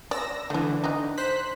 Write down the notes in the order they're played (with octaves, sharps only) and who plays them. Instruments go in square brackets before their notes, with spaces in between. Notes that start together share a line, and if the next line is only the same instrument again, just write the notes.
[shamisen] D5 [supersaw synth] E6 A#6
[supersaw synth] D3 E3 [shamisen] A3 D4
[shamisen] D4 D#4
[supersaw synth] C5 F#6 B6